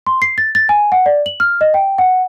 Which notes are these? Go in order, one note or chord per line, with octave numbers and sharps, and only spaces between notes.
C6
C7
A6
A6
G#5
F#5
D5
F#7
F6
D#5
G5
F#5